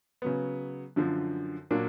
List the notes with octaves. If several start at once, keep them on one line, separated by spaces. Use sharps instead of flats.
C#3 F#3 B3
F#2 D3 F3
A#2 F#3 A#3 D4